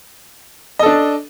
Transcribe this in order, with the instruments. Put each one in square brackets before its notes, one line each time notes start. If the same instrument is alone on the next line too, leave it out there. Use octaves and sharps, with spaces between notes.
[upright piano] D#5
A4
D4